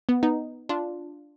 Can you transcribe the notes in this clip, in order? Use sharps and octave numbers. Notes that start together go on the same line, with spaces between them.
B3
B3 D#4
D4 F4